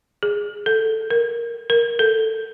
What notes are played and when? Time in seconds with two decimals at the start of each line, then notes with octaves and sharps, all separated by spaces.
0.23 G#4
0.66 A4
1.10 A#4
1.70 A#4
1.99 A4